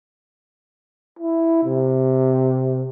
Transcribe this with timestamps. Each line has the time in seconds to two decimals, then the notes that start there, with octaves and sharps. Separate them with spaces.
1.19 E4
1.64 C3